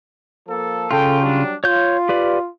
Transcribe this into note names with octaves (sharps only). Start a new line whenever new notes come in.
F3 A#3 A4
C#3 F4 A4 G5
F#3 G3 D4
F4 C#5 G6
G4 B4 D5